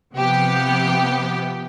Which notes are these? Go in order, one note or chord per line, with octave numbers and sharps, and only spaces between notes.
C3 F3 B3 G4